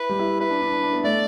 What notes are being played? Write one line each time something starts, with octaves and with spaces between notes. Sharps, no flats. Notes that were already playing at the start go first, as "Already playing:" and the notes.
Already playing: E4 B4
G3
E4
E4 B4
D4
D4
D4
D4
B3
A3 D5